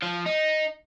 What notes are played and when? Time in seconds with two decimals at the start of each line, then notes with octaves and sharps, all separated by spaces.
0.03 F3
0.26 D#4